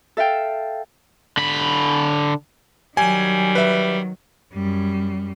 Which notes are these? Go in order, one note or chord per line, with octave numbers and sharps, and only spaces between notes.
A4 E5 F5 G5
D3 B5
D#3 F#3 G3 G#5
B4 E5
F#2 G3